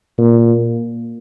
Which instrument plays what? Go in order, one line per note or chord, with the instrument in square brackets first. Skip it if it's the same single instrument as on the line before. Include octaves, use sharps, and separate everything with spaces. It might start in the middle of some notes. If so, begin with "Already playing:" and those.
[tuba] A#2